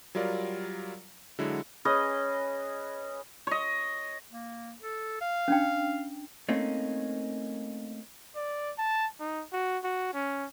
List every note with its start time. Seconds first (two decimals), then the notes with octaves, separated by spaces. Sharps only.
0.15 F#3 G3 F4 A#4 D5 F5
1.39 D3 F#3 G#3 E4
1.85 C#4 G#4 B4 D#5
3.47 C#5 D#5
4.31 A#3
4.82 A4
5.21 F5
5.48 C#4 D4 G5
6.49 A3 A#3 C4 C#4 D#4
8.36 D5
8.78 A5
9.20 D#4
9.53 F#4
9.84 F#4
10.14 C#4